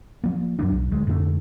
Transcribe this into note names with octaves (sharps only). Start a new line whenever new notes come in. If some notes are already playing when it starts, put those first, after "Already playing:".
F3 A#3
F#2 F3 F#3 D4
B1
D1 D2 G#3
F2 G#2 D3 A3